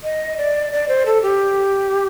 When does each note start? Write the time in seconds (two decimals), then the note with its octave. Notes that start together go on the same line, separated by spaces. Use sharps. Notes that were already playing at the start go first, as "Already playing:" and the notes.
0.04 D#5
0.38 D5
0.73 D5
0.88 C5
1.06 A4
1.22 G4